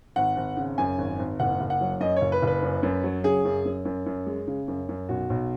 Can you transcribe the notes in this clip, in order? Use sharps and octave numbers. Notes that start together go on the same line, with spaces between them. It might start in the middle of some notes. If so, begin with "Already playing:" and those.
G#1 F#5
G#1
C#3
F#2 G#5
G#1
G#1
F#1 F#5
F#1
F#5
F#3
F#2 D#5
C#5
F#1
B4
F#1 B4
F#2
F#2
F#3
C#3 G#4
F#2
F#2
F#2
F#2
G#3
C#3
F#2
F#2
B1 F#4
B1